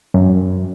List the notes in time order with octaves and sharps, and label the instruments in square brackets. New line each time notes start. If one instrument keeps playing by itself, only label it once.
[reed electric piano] F#2